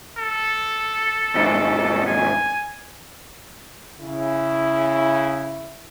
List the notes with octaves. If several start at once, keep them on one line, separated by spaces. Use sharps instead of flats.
A4
C2 G#2
G#5
C#3 E4